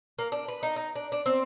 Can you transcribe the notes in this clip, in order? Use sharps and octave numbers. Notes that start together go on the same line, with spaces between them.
A#3
D4
B4
D#4
D#4
D4
D4
C4